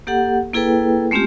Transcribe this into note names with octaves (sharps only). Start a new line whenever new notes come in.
A#3 G4 A4 F#5
A#3 E4 G#4 A4 B4 G5
G#3 A3 C4 C#4 F4 G4